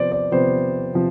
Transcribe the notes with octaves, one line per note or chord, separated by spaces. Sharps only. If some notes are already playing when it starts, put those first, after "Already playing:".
Already playing: C3 F3 B3 C5 D5
D5
C3 F3 B3 C5
C3 F3